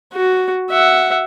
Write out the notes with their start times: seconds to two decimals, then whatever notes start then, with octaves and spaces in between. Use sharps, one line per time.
0.14 F#4
0.70 E5 F#5